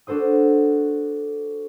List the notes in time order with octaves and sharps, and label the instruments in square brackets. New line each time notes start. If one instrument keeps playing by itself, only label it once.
[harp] D4 F#4 A4 C5 D#6